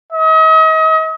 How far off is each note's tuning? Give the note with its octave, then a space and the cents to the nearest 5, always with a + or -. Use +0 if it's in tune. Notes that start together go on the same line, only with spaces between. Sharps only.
D#5 +40